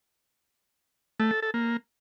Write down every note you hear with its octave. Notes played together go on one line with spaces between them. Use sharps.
A3
A4
A4
A#3